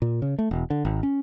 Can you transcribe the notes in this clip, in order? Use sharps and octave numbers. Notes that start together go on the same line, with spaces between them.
A#2
C#3
A3
E1
D3
G#1
C#4